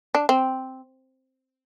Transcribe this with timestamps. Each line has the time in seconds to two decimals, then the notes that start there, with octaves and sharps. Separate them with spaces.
0.15 D4
0.29 C4